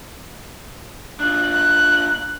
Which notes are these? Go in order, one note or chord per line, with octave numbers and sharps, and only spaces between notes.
D4 F4 F#6
F#6